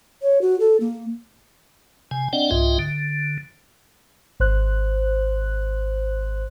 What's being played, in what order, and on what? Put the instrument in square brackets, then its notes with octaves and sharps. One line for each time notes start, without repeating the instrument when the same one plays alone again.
[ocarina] C#5
F#4
A4
A#3
[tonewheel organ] C3 G#5
C4 D4 D5 D#5 F#5 G5
C2 G#2 F4 D#5 E5 G5
D3
[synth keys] G#1 C5 F#6